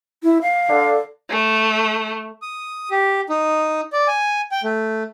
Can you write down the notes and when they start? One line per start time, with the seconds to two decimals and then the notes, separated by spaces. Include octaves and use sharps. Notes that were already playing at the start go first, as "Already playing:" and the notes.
0.23 E4
0.42 F5
0.69 D3
1.30 A3
2.42 D#6
2.91 G4
3.30 D#4
3.93 D5
4.08 G#5
4.52 G5
4.64 A3